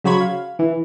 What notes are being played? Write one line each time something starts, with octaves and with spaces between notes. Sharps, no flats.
C#3 F#3 C5 C#5 B5 G#6
F5
E3